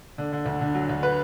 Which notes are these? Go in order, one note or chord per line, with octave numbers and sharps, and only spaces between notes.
D3
D3
D2
D3
F#3
D2
B4